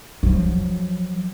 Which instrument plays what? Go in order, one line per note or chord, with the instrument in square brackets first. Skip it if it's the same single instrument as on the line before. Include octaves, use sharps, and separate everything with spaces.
[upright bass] F3 F#3